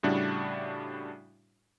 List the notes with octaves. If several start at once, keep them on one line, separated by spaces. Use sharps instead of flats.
A2 C#3 G3 D4 E4 F#4